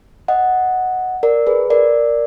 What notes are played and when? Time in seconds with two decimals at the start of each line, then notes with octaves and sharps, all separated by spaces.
0.28 D#5 F#5
1.23 A#4 D5
1.47 G#4 B4
1.70 A#4 D5